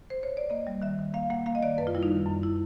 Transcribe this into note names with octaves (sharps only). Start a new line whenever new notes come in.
C5
C#5
D5
A#3 D#5
G3
D#3 E5
D#3
A#3 F5
A#3 F#5
A#3 F5
D#5
D#3 D5
F#2 B4
F4
G3 E4
D#4
D#3
F#2
E4